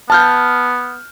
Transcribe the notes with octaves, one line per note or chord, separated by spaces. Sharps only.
B3 A5 F6 G6